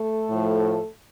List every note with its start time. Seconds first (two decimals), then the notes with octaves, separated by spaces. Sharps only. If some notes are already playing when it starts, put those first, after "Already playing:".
Already playing: A3 A4
0.29 A2 F3